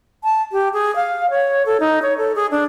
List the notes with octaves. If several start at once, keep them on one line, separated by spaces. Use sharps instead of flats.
A5
G4
G#4
F5
C#5
A4
D#4
C#5
A4
G#4
D4